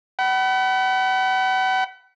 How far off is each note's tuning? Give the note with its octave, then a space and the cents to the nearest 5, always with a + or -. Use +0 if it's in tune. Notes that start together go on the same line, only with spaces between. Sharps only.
F#5 +40 B5 +0